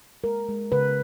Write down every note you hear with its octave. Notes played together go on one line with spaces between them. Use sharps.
G#3 A#4
G#3
C#3 B4